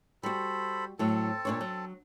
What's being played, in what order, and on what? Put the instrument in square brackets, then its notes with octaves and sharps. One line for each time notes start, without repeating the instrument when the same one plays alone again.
[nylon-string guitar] G3 F#4 [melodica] A4 C5 B5
[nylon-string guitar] A2 F#3 [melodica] C4 A4 A5
[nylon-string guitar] A#2 D4 C#5
F#3